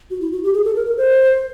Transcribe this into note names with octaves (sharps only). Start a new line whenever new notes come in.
F#4
E4
F#4
G4
G#4
A4
A#4
A#4
C5